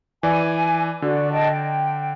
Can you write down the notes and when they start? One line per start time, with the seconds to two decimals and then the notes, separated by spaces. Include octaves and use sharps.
0.23 E3 D5 G#5
1.02 D3 F#4 D5
1.31 D#5 G5 A5
1.51 G5